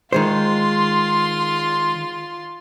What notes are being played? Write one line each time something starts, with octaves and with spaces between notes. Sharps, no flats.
D#3 G#3 F4 C5 C6